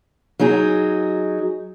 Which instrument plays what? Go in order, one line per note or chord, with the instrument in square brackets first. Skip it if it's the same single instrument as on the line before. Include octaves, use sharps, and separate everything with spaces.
[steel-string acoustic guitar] F#3 D#4 G#4